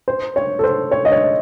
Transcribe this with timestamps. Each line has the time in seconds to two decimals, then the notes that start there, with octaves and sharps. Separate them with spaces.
0.08 C5
0.36 C#5
0.59 A4
0.64 C5
0.91 C#5
1.05 D#5
1.12 C#5